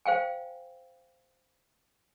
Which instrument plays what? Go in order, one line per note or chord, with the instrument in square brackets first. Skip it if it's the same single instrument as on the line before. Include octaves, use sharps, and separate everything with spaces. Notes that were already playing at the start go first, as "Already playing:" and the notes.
[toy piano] C5 F5 G5 G#5